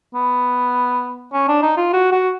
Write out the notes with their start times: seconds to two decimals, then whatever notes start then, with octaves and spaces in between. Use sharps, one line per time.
0.14 B3
1.33 C#4
1.48 D4
1.62 D#4
1.77 F4
1.93 F#4
2.12 F#4